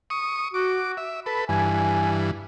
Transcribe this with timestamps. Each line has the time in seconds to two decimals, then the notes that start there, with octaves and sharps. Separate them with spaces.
0.10 C#6 D#6
0.54 F#4 D6
0.97 E5
1.26 A4 B4 B5
1.49 G2 E3 G#5